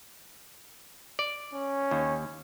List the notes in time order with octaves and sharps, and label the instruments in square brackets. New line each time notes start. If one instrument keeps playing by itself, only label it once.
[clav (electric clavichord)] D5
[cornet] C#4
[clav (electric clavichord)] D#2